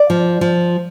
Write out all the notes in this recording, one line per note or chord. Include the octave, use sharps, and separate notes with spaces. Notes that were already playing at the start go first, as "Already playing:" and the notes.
Already playing: D5
F3
F3